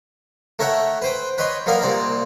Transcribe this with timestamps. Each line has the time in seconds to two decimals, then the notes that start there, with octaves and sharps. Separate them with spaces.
0.59 A3 A#4 C#5 E5 F#5 G5
1.02 B4 C5 G5
1.38 B4 C#5 D#5 G5 C6
1.66 F#3 A#3 B3 A#4 D5 F5
1.82 C2 A#2 C4 D5 A#5